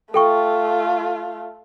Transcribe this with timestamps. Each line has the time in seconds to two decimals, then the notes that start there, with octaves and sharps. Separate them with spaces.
0.14 A3 F4 A4 G5 C#6